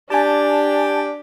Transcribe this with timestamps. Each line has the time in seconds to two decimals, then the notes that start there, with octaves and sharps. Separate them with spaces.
0.10 D4 G4 G#5 A5